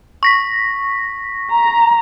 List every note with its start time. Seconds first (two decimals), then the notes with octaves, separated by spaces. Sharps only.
0.23 C#6 A#6 B6
1.51 A#5